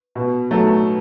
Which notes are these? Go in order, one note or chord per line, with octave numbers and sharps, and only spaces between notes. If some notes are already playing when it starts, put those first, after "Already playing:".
B2
F#3 A3